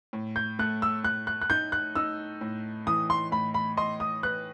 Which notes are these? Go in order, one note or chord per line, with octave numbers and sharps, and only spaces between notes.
A2
G6
A3 F#6
E6
A2 F#6
F#6
F#6
D#4 G6
F#6
D#4 E6
A2
E3 D#6
C6
A2 B5
B5
D#5 C6
D#6
B4 F#6